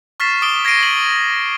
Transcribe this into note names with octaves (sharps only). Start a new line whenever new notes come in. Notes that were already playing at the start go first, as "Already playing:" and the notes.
C#6 F6 A6 B6 C7 E7
D6 D#6 D7 G7
G#6 A#6 C7 D7 D#7
F#7